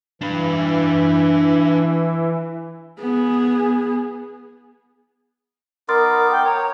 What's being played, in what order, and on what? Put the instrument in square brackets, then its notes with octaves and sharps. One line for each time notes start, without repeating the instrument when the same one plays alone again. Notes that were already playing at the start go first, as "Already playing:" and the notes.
[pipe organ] E3 [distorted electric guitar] D4 B4
[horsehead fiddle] B3 G#4
[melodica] B3 D#4 D6 [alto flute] A#4 [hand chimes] C6 F6 A6
[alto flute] G5
[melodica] C#5 [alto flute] A#5